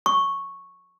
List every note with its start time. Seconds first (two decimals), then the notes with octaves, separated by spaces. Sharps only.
0.06 C#6